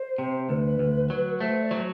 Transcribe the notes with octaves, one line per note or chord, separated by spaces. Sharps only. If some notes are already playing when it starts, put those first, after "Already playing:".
Already playing: C5
C3
D2 B4
D2
F#3
A3 C5
D5
F#3 C5